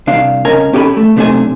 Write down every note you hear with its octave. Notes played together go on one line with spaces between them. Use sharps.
C2 D4 F5
C#2 C#4 A#4 G#5 A#5
C#4 G4 A4 E5 G#5 B5
A3
B1 C3 A3 D4 C5 G#5